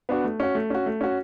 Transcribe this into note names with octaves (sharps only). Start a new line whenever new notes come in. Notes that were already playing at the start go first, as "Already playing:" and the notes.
B3 D4 F#4
A3
C#4 F#4
A3
C#4 F#4
A3
C#4 F#4